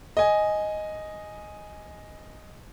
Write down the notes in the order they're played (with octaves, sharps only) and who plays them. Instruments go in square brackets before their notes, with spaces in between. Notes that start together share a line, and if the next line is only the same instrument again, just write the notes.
[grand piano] D#5 G#5